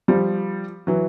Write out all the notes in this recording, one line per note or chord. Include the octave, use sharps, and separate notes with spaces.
F3 G3
E3 F#3